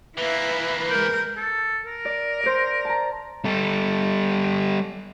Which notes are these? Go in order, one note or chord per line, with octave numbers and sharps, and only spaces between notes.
E3 A#3 E4 B4 E5
G#3 A#4 G6
A4
A#4
D5
C5 D5
A5 A#5
G3 A4